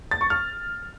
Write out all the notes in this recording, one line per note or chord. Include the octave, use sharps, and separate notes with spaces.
A6
C#6
F6